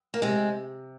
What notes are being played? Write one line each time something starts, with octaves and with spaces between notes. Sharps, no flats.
A#3
C3 G#3 C4